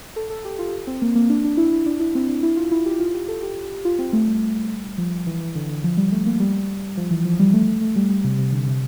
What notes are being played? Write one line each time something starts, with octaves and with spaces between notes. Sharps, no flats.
A4
A4
G4
F4
C4
A#3
A#3
D4
D4
E4
E4
D4
E4
C4
D4
E4
F4
E4
G4
F4
G4
A4
G4
F4
C4
A3
G3
F3
E3
E3
D3
D3
F3
G3
A3
A#3
G3
F3
E3
F3
G3
A3
A3
A3
G3
G3
C3
C3
D3
C3